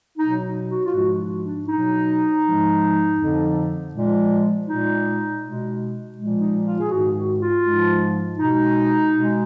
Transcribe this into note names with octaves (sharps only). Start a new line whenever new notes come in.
B2 F#3 D#4
F#4
F4
G#2 F3 G#3 F#4
D4
B2 F#3 D#4
G#2 F3 G#3
F2 D3 F3
A#2 F3 G#3
A#2 G#3 D#4
B2 G#3
A#2 F3 G#3
D#4
F4
G#4
G#2 D#3 G#3 F#4
F#4
F4
G#2 F3 G#3
B2 G#3 D#4
B2 G#3